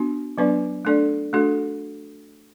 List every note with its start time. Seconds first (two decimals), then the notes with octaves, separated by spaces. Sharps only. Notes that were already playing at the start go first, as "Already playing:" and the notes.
Already playing: B3 D4 F#4
0.38 F#3 B3 D4 B4 D5
0.85 A3 D4 A4 D5
1.33 A3 D4 F#4 A4